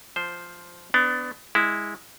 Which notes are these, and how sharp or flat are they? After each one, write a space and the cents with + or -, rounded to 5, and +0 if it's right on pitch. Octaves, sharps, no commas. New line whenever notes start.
F3 +0 C5 +0
B3 +25 D4 +0
G#3 -10 E4 -15